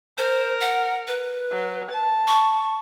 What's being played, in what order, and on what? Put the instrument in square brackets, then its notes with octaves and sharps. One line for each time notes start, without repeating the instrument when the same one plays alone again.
[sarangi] A#4 [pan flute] C5
[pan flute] F#5
B4
[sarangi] F#3
A5
[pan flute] C#6